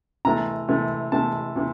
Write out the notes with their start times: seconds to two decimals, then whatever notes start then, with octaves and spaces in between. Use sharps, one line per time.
0.25 C3 E3 A3 A#5
0.68 C3 E3 A3
1.12 C3 E3 A3 A5
1.56 C3 E3